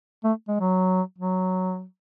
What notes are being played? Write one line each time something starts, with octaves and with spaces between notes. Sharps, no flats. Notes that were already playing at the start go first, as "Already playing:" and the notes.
A3
G#3
F#3
F#3